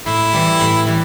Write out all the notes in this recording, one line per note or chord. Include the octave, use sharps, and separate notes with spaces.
A2 E4
E3 G3
A2
E3 G3